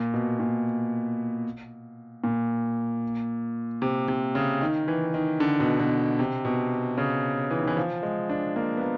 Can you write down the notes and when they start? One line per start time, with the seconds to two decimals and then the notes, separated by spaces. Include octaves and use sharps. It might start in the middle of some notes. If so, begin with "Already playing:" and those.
Already playing: A#2
0.14 B2
0.40 A#2
2.24 A#2
3.82 C3
4.08 C3
4.35 C#3
4.61 D#3
4.88 E3
5.14 D#3
5.40 D3
5.60 B2
5.80 B2
6.19 C3
6.45 B2
6.98 C#3
7.51 E3
7.59 D#3
7.67 E3
7.77 F3
8.03 G#3
8.29 D4
8.56 A#3
8.77 B3
8.82 A#3